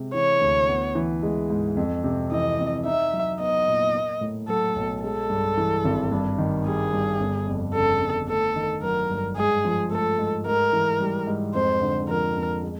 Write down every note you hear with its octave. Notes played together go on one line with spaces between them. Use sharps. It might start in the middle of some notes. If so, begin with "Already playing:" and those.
Already playing: C3 G#3
E3 C#5
D2
B3
E3
G#3
G#2
F2
C3
E3 D#5
F2
D#4 E5
F#3
B3 D#5
A#2
A#3
A2
F#3 A4
B1
G#3 A4
G2
E3
G#1
G2
D#3
G3 G#4
G2
G1
F2
C#3 A4
G1
A3 A4
D#3
F#3 A#4
G2
G#2 G#4
F3
A3 A4
G#2
G#2 A#4
E3
G3
G#2
F2 C5
D3
F3 A#4
F2
G#3